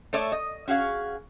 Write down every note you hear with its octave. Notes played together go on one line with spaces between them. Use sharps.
A3 A4 C#5 D5 E5
D#5
C#4 F#4 G#4 F5